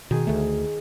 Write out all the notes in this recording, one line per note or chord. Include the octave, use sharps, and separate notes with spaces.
B2 D#3 G#4
D2 A3